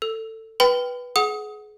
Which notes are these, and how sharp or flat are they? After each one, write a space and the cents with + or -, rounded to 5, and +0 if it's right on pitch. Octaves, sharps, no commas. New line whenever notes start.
A4 +20 E6 +0
B4 -5 G5 +0 B5 +40
G#4 +30 F#5 +0 D#6 +25